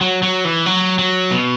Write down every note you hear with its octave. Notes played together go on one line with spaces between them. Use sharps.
F#3
F#3
E3
F#3
F#3
B2